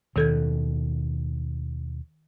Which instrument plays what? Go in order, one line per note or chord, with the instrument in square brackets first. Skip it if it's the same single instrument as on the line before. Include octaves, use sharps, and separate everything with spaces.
[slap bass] D#2 B2 [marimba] D#3 A4 G#6